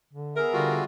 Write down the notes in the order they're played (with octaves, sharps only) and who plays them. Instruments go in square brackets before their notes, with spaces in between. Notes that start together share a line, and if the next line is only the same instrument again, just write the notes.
[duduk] D3
[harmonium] B3 G#4 E5 [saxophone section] A#4
[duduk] D3 [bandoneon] G3 F4 F#4